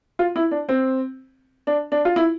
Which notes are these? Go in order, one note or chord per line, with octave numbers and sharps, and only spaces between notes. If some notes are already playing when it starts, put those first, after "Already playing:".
F4
E4
D4
C4
D4
D4
F4
E4